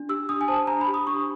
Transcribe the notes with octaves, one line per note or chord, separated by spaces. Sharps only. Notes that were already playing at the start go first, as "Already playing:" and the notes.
Already playing: D4
G4 E6
D4 D#6
G#5
C5 A5
D4 A#5
B5
G4
D#6
D4 C#6